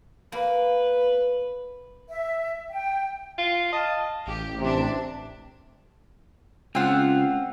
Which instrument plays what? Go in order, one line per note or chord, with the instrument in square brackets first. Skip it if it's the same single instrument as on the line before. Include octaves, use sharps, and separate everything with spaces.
[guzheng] A#3 [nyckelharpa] B4
[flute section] E5
G5
[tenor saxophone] F4
[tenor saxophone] D#5 [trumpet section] F5 A5
[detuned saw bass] A1 [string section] G4
[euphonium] C3 [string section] E3 D4
[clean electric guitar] C#2 F4 [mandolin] C4 F#5